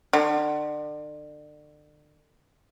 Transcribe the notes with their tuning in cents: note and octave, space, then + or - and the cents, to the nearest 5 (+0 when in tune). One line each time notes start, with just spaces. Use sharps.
D3 +35